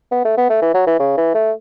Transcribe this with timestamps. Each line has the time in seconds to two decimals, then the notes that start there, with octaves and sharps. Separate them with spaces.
0.11 B3
0.25 A3
0.37 B3
0.50 A3
0.62 E3
0.74 F#3
0.87 E3
0.99 C#3
1.17 E3
1.34 A3